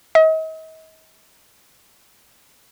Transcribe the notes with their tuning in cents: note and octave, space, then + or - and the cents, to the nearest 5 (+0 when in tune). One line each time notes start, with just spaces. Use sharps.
D#5 +40